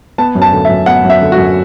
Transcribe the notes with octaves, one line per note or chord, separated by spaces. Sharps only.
B3 A5
F#2
A5
D3
E5
F#2
B3 F#5
F#2
E5
D3
F#4
F#2